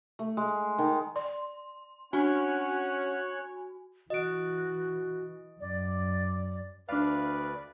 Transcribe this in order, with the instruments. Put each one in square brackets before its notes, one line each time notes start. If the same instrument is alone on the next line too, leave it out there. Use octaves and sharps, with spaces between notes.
[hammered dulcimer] A3
G#3
D#3
[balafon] D5 [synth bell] C6
[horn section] C#4 F#5 [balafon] D4 [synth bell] F#4 G#5 [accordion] C#5 F#6
[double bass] E3 [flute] F#4 [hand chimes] D#5 D7
[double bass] F#2 [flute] D5
[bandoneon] D2 B4 D5 [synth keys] D4 F5